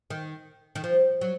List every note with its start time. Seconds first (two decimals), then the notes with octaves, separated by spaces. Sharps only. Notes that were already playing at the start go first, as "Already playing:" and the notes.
0.10 D#3
0.75 D#3
0.84 F3
1.21 F#3